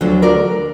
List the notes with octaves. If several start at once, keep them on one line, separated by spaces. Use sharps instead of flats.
D2 D3 F#3
A#4 D5